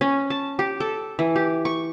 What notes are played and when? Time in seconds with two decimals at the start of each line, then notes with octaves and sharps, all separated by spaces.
0.01 C#4
0.30 A5
0.59 G4
0.80 A4
1.19 E3
1.36 G4
1.65 C#6